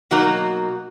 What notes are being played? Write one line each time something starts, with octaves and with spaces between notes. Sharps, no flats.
B2 F#3 A#3 D#4 F#4